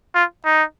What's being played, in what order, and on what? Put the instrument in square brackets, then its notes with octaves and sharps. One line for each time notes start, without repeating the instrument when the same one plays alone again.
[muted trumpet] F4
D#4